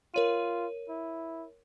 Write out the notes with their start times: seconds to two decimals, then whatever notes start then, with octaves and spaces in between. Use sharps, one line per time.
0.14 F4 A#4 C#5 D#7
0.89 E4